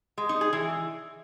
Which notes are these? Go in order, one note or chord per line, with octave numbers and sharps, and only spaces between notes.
G#3
D#4
G#4
E3